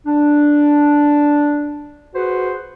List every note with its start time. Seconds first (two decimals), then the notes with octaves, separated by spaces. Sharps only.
0.06 D4
2.15 F#4 G#4 B4 C5